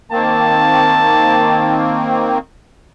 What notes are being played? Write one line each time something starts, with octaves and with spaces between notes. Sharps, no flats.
D#3 A#3 C4 A5